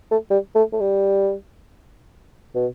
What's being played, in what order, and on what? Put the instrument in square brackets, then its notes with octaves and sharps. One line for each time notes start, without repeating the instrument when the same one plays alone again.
[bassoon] A3
G3
A3
A3
G3
B2